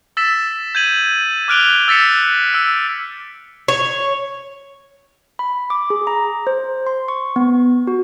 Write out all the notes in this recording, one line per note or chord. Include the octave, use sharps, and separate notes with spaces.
E6 A6 B6 E7
G6 G#6 D#7 F#7
D6 F6 F#6 D7 F7 G7
E6 A6 B6 C#7 E7
E6 D7
C#5
B5
D6
G#4
A#5
C5
C6
C#6
B3
F#4